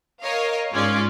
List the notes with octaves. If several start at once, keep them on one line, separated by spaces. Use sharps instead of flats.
A#4 C#5 D#5 F5
G#2 G#3 C#4 F4 D5